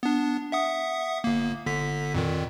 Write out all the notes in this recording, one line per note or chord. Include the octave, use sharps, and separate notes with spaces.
B3 D4
E5 F#5 D#6
G1 A#3
G1 D3 B6
F2 A#2 D#3